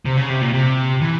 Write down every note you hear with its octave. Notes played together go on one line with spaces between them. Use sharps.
C3
C#3
C3
A#2
C3
E3